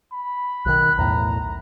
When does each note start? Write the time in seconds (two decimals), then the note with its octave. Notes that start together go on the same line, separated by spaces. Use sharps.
0.13 B5
0.66 B1 D#3 F#6
0.98 B1 E2 A2 A#5